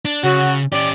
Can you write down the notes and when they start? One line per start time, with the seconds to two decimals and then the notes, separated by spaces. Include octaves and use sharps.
0.05 D4
0.24 C#3 F#3 F#4
0.72 C#4 G4 D5